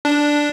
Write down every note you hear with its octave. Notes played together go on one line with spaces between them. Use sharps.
D4